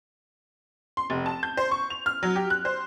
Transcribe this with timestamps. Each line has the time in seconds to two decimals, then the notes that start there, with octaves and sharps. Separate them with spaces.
0.97 C6
1.10 F1
1.26 A5
1.43 G6
1.57 C5
1.71 C#6
1.90 F7
2.06 F6
2.23 F#3
2.36 G4
2.50 F#6
2.65 C5